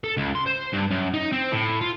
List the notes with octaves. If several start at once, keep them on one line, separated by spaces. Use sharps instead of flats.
A4
C#2
C6
C5
G2
F#2
D#4
C4
A2
F4